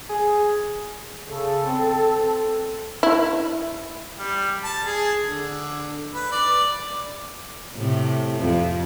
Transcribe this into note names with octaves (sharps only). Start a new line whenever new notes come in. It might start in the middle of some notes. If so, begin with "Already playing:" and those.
G#4
C#3 A4
C4
E4
G3
A5
G#4
D3
B4
D5
A2 C3
F2